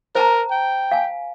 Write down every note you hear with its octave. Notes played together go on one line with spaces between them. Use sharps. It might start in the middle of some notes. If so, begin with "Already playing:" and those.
A#4 C5 A5 A#5
G5
F5 G#5